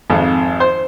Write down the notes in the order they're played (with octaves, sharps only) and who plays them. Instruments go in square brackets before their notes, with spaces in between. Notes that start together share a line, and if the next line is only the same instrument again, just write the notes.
[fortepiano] G#1 F2
C5